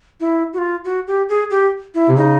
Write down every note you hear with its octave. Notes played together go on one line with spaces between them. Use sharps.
E4
F#4
F4
F#4
G4
G#4
G4
E4
C3
C#3 D#4